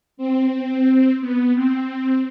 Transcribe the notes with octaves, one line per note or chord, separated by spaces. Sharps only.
C4
B3
C4